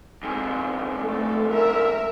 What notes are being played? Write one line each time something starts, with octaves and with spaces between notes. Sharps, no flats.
F2 G#2
A3 A4
A#4 E5